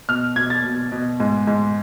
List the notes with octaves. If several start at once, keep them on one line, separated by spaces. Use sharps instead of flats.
B2 F6
B2 G#6
A6
B2
B2
G#2
G#2